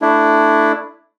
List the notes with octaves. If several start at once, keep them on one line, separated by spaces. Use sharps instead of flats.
A3 D4 E4